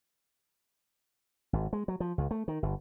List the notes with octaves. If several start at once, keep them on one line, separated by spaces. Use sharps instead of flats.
G#1
G#3
F#3
F3
C#2
A3
D#3
G1